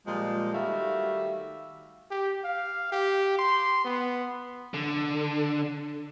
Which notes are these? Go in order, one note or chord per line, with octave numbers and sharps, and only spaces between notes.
A#2 F3 G3 G#3
D#3 G3 A3 F#4 E5 F5
G4
F5
G4
C6
B3
D3